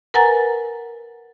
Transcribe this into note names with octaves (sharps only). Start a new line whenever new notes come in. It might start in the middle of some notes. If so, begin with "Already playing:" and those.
A#4 B4 F#5 G#5 A#5 A6